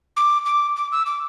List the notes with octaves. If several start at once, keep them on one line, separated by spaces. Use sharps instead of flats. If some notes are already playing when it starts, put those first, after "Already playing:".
D6
D6
D6
E6
D6